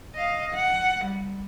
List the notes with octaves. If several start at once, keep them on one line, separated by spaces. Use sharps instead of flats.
D#5 F5
F#5
G3